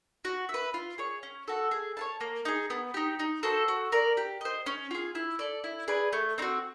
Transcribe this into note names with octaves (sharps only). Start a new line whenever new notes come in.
F#4
E5
B4
F4
G#4 C#5
C#4
F#4 A4
G#4
C#5 F5 A5
A#3
D#4 G#4
B3
D#4 G4
D#4
F#4 A4 C5
F#4
A#4 D5
G4
C5 D#5
C#4
F4 G#4
E4
A4 D5
E4
G#4 B4 D5
A3
C4 D#4 F#4